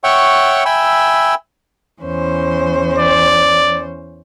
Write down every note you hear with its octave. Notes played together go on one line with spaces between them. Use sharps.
C#5 E5 F#5 G5 C#6
E5 G5 G#5 B5 E6
E2 C#4 C5
D5